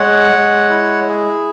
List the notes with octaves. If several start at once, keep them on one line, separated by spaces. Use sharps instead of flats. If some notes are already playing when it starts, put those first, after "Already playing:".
Already playing: G#3 C#5 F#5
G#3
E4
G#4